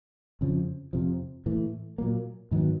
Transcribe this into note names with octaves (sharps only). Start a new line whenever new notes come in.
F2 C#3 F3
F2 C3 F3
A2 E3 A3
A#2 F#3 A#3
G#2 D#3 F#3 B3